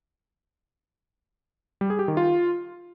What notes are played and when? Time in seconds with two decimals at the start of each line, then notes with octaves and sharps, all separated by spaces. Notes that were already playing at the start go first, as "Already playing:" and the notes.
1.81 G3
1.90 G#4
1.99 G4
2.08 D#3
2.17 F4